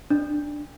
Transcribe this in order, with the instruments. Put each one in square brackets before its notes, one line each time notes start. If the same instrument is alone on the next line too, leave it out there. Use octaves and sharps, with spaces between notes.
[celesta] D4